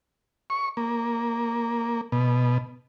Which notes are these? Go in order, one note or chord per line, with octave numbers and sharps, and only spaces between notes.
C#6
A#3
B2